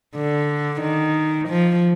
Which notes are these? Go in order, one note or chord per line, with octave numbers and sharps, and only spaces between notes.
D3
D#3
F3